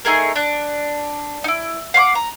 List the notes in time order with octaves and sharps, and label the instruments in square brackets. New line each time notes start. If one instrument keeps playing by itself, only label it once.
[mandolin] A3 D#4 G#4 A#4
D4 F#6
D#4 E4
F5 F#5 C#6 D6
A#5